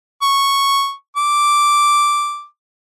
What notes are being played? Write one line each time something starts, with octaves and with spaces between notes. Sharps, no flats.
C#6
D6